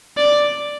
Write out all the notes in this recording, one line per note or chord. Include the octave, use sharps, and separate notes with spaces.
D5